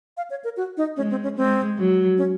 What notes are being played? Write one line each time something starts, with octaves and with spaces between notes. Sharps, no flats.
F5
C#5
A#4
F#4
D#4
G#3 C#4
C4
C#4
G#3 C4
F#3
C#4